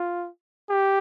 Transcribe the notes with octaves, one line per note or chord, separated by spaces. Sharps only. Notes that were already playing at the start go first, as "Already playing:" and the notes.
Already playing: F4
G4